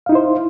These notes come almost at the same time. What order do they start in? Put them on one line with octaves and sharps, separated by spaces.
F5 D#4 E4 C5